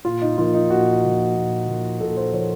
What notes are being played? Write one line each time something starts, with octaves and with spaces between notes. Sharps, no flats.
A#2 F4
D#4
F3 A#3 F4
D#4
A#2 F#4
F3 A#3
A#2
F3 A#3
A#2 A4
C5
F3 A#3 C#5